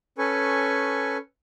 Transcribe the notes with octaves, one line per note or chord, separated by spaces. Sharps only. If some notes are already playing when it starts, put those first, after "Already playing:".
C#4 A4 B4 G#5 C#6